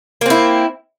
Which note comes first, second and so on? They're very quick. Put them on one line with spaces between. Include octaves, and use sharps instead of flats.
A#3 C4 E4